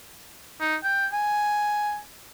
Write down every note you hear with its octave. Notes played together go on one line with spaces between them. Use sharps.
D#4
G5
G#5